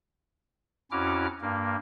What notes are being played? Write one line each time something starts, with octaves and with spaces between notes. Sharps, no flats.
F2 C#4 E4 F#4 D6 F6
G2 A#3